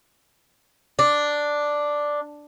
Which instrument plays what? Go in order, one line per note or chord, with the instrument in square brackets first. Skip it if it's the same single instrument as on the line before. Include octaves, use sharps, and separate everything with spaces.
[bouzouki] D4